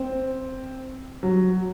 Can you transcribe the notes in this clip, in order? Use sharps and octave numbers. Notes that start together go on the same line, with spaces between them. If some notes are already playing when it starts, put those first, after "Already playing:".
Already playing: C4
F#3